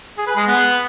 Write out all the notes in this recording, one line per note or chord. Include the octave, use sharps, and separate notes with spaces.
G#4
B4
G#3 G#4
B3 B4